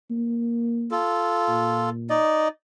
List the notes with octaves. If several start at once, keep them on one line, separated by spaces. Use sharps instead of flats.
A#3
F4 A4
A#2
D#4 D5 D#5